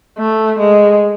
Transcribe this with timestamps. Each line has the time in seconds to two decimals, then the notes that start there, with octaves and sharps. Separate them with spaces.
0.19 A3
0.59 G#3